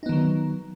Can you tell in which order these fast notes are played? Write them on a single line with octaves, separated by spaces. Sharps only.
D#4 B3 D#3 F#3